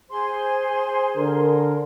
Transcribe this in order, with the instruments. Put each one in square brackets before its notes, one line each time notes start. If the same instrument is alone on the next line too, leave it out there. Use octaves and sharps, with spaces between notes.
[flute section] G#4 C5 C6
[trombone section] D3 A#4